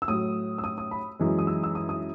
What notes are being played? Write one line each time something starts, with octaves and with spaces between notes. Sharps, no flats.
E6
A2 F#3 D#6
E6
D#6
D#6
B5
F#2 E3 G#3
D#6
E6
E6
D#6
D#6